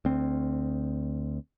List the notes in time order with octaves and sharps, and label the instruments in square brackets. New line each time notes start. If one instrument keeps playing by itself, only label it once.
[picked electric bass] D2 C4